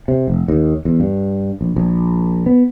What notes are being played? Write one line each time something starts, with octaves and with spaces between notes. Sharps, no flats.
C3
F1
D#2
E2
G2
A#1
A#1
B3